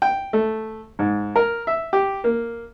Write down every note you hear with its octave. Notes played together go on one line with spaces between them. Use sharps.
G5
A3
G#2
A#4
E5
G4
A#3